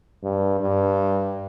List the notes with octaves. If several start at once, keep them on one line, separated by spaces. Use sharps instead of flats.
G2
G2